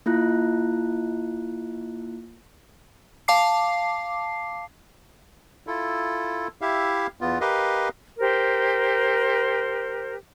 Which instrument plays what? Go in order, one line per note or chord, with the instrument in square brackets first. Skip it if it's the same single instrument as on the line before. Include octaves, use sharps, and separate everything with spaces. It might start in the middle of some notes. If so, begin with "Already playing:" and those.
[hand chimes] A#3 E4 F4 F#6
[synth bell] F5 A5 D6 C7
[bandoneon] E4 F4 A4
E4 G4 E5 F5
E2 B3 F4
G4 A#4 B4 D#5 F5
[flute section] G4 A#4 C5